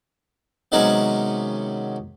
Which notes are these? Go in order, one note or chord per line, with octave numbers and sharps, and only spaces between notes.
C3 D#3 F#3 G#3 B3 C#4